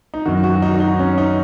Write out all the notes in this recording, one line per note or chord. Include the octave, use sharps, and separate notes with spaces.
D#4
F#2 D#3 F#4
F#4
F#4
D#4
F#4
D#4
C#4
D#4